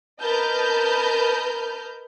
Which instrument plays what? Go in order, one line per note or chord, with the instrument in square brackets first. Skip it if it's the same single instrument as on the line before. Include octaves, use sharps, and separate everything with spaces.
[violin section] A#4 B4 D#5 A5 F6 G6